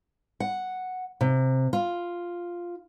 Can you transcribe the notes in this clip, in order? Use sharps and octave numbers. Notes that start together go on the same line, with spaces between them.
F#5
C3
F4